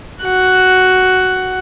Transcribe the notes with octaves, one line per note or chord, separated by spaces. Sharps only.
F#4 F#5